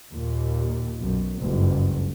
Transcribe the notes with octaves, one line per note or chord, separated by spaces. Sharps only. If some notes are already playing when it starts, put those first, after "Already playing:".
D#2 A#2
B1 F#2
F#1 C#2 G2